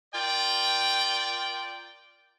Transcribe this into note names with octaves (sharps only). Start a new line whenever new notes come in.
F4 A#4 D5 G5